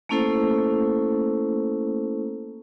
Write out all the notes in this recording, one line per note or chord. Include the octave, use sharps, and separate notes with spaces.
A3 A#3 C#4 E4 A4 C5